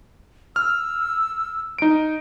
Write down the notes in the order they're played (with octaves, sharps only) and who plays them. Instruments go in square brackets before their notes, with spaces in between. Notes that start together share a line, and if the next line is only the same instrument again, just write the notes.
[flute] E6 [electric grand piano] F6
[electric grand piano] D#4 D7